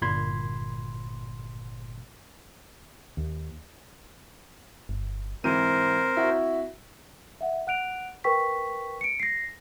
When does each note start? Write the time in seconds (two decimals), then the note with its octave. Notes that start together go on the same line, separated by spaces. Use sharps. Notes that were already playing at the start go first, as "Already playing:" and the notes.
0.02 G1 A#2 B5 C6 G#6
3.17 D#2
4.89 G1
5.44 G#2 E3 C4 A#4 C5 D#7
6.17 E4 F#4
7.41 E5 F#5
7.67 F#5 F#6 D7 F7
8.24 A#4 B4 G5 C#6 B6
9.01 C#7 D7
9.20 A#6 C7